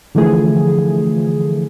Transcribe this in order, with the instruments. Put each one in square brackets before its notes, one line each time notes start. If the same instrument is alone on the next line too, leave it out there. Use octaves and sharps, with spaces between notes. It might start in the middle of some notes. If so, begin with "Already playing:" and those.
[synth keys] D3 E3 F3 A3 G#4